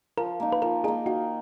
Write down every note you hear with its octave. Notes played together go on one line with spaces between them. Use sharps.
F3 A#4
A#3 D#4
B4
F3 A#4
A#3 D#4 G#4
D#3 F#4